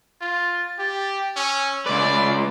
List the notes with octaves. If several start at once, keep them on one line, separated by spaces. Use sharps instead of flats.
F4 A6
G4
C#4 E6
C#2 B4 D5 D6